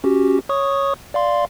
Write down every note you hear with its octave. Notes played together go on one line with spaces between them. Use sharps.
C#4 F#4 G4
C#5 C#6 D#6
D5 F5 C6